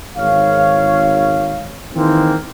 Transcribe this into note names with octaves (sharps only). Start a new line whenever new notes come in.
G#1 C#5 F5
D#3 E3 G#3 A#3 C4